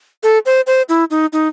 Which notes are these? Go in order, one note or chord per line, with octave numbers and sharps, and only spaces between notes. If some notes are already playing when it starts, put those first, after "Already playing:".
A4
C5
C5
E4
D#4
D#4